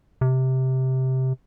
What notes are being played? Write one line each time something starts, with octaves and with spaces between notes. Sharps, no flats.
C3